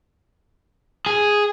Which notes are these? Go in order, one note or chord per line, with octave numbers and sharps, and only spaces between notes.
G#4